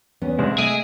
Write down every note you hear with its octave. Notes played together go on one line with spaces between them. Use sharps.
E2 B3 C#4
C2 G#3 C4 D4
G#3 A3 G#4 D#5 E5 D7 D#7